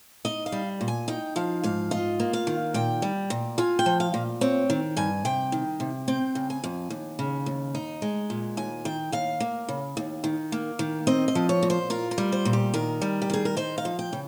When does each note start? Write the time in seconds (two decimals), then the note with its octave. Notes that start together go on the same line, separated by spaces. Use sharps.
0.25 D#4 D#5
0.46 F5
0.52 G3
0.81 A#2
0.88 G#5
1.08 D#4 G5
1.36 F3 F5
1.63 G#2 F5
1.91 F4 D#5
2.20 A#3
2.33 F5
2.47 D#3
2.74 A#2 G5
3.02 G3
3.30 A#2
3.58 F4 G#5
3.79 G5
3.86 F3
4.00 F5
4.14 A#2
4.41 C4 C#5
4.70 D#3
4.97 G2 G#5
5.25 C3 G5
5.52 D#3
5.80 C3
6.08 C4 G5
6.35 C#3
6.50 G#5
6.64 F2
6.90 D#2
7.19 C#3
7.46 D#2
7.75 D#4
8.02 G#3
8.30 A#2
8.57 D#2 G#5
8.85 D#3 G5
9.12 D#2 F5
9.40 A#3
9.68 C#3
9.97 D#2
10.24 D#3
10.52 A#3
10.79 D#3
11.07 C4 D#5
11.28 D#5
11.35 F3
11.49 C#5
11.63 A#2
11.70 C5
11.90 F4 A#4
12.11 A#4
12.18 G3
12.32 C5
12.45 A#2
12.53 G4
12.74 D#3 A#4
13.01 G3
13.22 G4
13.30 D#3 G#4
13.45 A#4
13.57 D#4 C5
13.78 F5
13.85 F3
13.99 G5
14.13 C#3